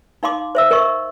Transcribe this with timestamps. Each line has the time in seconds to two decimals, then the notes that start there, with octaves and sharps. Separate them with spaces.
0.23 D#4 F5 C6 D6
0.55 C5 E5 E6
0.71 A#4 D#5 C#6